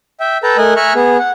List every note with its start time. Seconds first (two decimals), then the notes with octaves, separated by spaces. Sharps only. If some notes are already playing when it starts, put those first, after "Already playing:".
0.20 E5 G5
0.43 A4 B4 G5 A5 A#5
0.57 A3 A#4 D#5 G#5 F#6
0.76 E5 G#5 A#5 C#6 F6 F#6
0.95 B3 G#4
1.19 F#5